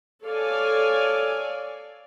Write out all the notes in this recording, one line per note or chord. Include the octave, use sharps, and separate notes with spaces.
A4 C#5 D5 F5 G#5